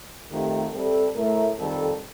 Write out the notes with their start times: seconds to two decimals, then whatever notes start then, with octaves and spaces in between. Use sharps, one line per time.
0.31 F2 D#3 A3 G4
0.73 C3 G3 A4
1.15 A2 A3 A#4
1.57 F2 D#3 G3 A4